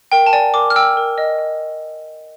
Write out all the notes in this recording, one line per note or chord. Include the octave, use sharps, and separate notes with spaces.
A#4 G5
A5
D5 G#5
A#4 D6
F6
G5 E6
A#4
D#5
D#5